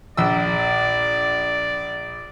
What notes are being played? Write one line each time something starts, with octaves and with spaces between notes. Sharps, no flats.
A#1 D5 E6